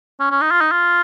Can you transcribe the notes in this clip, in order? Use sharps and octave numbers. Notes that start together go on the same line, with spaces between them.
C#4
C#4
D#4
F4
D#4
F4